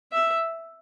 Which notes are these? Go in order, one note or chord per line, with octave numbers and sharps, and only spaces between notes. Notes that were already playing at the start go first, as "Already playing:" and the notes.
E5